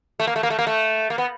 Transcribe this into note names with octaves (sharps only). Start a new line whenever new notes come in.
A3
A#3
A3
A#3
A3
A#3
A3
A#3
B3